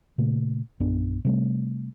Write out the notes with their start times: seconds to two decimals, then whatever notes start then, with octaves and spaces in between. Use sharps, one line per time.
0.18 A#2 C#3 A3
0.80 A#1 F#2 B3 D4
1.25 C3 G3 A3